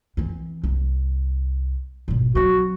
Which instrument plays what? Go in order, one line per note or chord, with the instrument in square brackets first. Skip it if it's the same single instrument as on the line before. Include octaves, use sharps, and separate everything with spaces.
[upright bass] E3 C4
C2
G#1 B2
[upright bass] F#3 C4 [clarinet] F#4